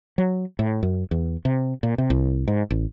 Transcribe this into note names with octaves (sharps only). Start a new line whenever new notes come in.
F#3
A2
F#2
E2
C3
A#2
C3
C2
G#2
A1